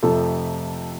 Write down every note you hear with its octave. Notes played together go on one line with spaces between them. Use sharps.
F2 C3 F3 A3 A4